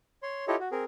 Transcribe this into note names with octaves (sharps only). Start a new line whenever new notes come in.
C#5 C6
E4 F4 G4 A4 C#5 D#5
F#4
C4 G#4 A#4